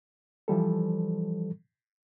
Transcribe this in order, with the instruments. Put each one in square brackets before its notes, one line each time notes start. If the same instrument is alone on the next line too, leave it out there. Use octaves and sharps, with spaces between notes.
[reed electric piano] E3 F3 G3 A4